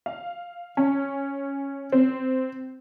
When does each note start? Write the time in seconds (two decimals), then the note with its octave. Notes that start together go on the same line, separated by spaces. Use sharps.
0.06 F5
0.77 C#4
1.92 C4